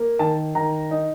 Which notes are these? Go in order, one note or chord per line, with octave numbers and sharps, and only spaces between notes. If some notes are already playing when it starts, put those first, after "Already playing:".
Already playing: A#3
D#3 A5
D#3 A#5
D#4